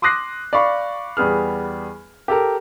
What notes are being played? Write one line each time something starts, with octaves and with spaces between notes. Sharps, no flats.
C6 D6 D#6 F#6 A#6 C7
D5 F5 B5 C#6
E2 G3 B3 G#4 F6
G4 A4 A#4